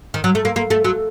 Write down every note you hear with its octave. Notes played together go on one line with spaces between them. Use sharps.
D#3
F#3
A3
A#3
A#3
A3
F#3